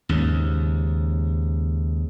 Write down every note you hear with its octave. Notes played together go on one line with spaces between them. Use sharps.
D#2 G#2 C#3